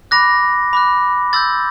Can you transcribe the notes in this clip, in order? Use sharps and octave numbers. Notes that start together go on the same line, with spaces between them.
B5 D6 F#6 A#6
B5 D6 F#6
C6 E6 G6 A6